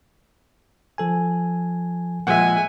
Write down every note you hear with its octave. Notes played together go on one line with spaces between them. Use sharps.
F3 A4 G#5
A#2 F3 G#3 E5 F#5 G#5